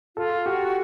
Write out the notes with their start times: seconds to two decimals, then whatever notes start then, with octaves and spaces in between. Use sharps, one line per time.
0.16 F4 A4
0.46 F#4 G4